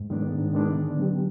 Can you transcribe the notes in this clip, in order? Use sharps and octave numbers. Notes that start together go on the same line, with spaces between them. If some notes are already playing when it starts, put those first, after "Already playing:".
Already playing: G#2
D#3 G#3 B3 D4
G#2
D#3 G#3 B3 D4
D3
F#3 B3 D4 G4